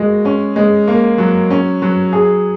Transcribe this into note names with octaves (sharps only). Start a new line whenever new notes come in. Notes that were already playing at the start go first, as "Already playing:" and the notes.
Already playing: G#3 A#3 F#4
C#4
G#3
A#3
F#3
C#4
F#3
G#4